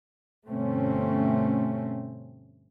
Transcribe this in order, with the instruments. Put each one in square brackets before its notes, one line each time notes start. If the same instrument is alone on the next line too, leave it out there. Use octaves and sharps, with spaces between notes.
[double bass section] G1 B2 A3 C4 C#4